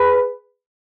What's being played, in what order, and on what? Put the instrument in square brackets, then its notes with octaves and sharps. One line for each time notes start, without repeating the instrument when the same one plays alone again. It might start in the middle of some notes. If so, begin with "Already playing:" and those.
Already playing: [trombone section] G#4 B4